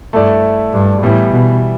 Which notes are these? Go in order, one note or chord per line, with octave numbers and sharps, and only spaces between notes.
G2 A3 E4 A4 D5
G2
A2 E3 G3 B3
B2